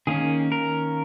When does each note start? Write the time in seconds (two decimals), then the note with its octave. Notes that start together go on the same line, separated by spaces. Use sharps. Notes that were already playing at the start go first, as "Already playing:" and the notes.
0.07 D#3 A#3 C#4 G#4
0.52 A#4